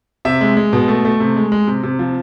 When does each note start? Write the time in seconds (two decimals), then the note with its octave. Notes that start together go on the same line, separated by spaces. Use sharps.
0.25 C3 E5
0.41 G#3
0.57 G#3
0.73 B2
0.88 A3
1.05 A3
1.20 C3
1.36 G#3
1.52 G#3
1.67 C3
1.83 C3
1.99 F3